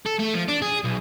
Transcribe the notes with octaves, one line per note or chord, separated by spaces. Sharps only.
A4
A3
F3
D4
G#4
B1